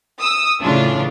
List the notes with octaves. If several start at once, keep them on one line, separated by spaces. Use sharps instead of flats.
D#6 E6
A2 C#3 E3 D4 F4